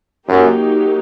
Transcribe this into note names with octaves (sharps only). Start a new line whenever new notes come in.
F#2 F#3 A#3 D#4 G4